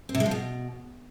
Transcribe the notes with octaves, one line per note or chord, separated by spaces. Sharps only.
C4
C3
G#3
F3
B2